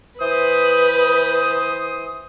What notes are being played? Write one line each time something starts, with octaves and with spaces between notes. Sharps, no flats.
E3 B4 C5 D#6